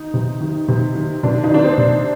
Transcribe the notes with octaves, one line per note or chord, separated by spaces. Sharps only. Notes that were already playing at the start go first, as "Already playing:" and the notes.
Already playing: D#3 D#4
C3
D#3
C3
D#3
C3 D4
D#4
D#3 D4
C4
C3